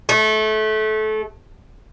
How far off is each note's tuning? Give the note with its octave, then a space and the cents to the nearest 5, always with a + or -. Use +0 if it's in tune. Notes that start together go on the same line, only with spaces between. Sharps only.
A3 -25